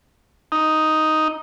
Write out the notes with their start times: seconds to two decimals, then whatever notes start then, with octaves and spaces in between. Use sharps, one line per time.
0.52 D#4